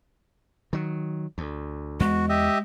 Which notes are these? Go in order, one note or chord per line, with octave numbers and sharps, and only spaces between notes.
D#3 F#3
D2
E2 G#3 F#4
G4 D#5 E5